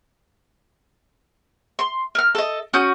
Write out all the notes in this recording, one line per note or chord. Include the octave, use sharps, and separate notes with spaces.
C6
A#4 F6
A4 D#5
C#4 F#4 D#6 G6